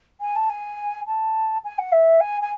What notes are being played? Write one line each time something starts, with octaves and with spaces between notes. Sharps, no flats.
G#5
A5
G#5
A5
G#5
F#5
E5
G#5
G#5